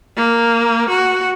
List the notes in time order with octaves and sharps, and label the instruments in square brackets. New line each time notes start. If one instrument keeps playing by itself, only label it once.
[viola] A#3
F#4